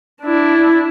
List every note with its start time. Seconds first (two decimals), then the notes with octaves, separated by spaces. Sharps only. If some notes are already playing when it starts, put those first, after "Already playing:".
0.22 D4 E4